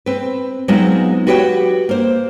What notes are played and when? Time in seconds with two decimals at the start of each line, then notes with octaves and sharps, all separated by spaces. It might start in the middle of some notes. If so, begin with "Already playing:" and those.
0.06 C4 B4
0.68 F#3 G#3 B3 C4 D#4 F4
1.27 F#4 G4 B4 C#5 E5 G5
1.89 A#3 C5